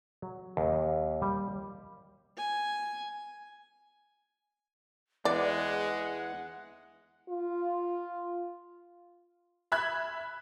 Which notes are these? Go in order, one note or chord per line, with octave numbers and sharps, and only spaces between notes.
F#3
D#2
G3
G#5
E2 G#3 D5 F#5
F4
E5 B5 F#6 G#6